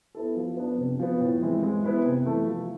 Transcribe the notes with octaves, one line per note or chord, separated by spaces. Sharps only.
B3 E4 A4
F3
B3 D4
C3
F3 B3
A2
E3 G#3 C4 E4
G#3
B3 E4 B4
C3
E3 A3
F3